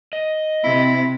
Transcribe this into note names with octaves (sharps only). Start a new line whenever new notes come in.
D#5
C3 E4